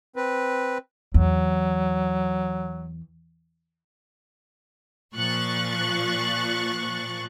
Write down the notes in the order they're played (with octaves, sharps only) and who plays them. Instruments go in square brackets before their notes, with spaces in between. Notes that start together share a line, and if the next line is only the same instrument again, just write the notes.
[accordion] C4 B4
[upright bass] E2 [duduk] F#3
[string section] A#2 F3 C#6 F#6 A6